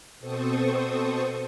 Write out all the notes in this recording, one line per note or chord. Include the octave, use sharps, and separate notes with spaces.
B2 C4 A4 C5 C#6 D#6